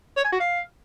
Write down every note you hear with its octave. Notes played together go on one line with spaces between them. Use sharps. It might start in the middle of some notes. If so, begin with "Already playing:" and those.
C#5
G#5
F#4
F5